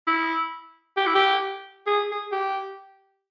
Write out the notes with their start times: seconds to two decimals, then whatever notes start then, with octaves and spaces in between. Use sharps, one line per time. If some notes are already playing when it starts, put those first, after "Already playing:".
0.07 E4
0.97 G4
1.06 E4
1.15 G4
1.86 G#4
2.11 G#4
2.32 G4